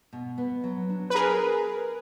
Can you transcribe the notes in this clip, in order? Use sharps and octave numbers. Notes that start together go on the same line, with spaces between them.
B2
B3
F#3
D4
B4
G4 G#4 A#4